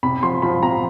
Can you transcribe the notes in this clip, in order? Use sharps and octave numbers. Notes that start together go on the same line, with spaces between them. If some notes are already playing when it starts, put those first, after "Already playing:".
C3 B5
F3 C6
F3 B5
C3 A#5